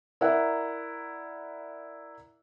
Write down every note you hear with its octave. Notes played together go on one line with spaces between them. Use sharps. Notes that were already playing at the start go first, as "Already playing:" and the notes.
E4 A#4 D5 E5 F#5 A#5